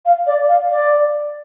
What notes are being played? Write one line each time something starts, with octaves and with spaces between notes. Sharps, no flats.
F5
D5
F5
D5